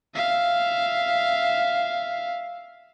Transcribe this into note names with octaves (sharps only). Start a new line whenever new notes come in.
E5 F5